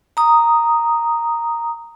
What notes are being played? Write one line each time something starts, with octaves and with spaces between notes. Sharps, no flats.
A#5 D#6